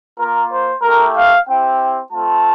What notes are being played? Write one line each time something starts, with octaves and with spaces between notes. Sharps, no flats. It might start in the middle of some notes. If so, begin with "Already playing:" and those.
A#3 F4 A#4
C5
A3 E4 G4 A#4
F5
C4 E4 G4 G5
A3 C4 F4 A5